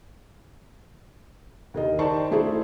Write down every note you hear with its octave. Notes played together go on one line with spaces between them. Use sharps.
D#2 A#4 D#5
D#4 G4 C5 D5 A5 C#6
A3 E4 F#4 G#4 C5